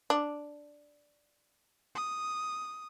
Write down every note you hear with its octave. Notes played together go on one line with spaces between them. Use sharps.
D4
D#6